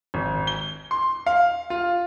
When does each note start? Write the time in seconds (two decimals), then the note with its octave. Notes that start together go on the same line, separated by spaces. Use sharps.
0.14 G#1
0.47 G7
0.91 C6
1.26 F5
1.70 F4